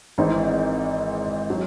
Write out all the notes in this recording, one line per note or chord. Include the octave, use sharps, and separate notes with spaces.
G#1 G#2 E3 C4 D#4
F#3